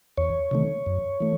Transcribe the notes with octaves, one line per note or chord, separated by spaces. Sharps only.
E2 C#5
C3 D#3 A3
F#2
E3 A3